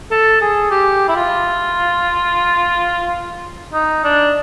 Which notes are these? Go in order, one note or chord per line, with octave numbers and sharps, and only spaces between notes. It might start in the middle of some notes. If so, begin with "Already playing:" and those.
A4
G#4
G4
E4
F4
D#4
D4